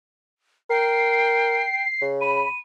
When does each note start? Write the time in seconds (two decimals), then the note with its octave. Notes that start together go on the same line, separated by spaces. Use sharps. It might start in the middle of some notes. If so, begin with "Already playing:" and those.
0.70 A#4 G5 C7
2.02 C#3
2.21 B5 D#7